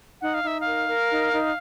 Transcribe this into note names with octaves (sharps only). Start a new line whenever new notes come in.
D#4 F#5
F5
D#4 E5
A#4 F5
A#4
D#4
D#4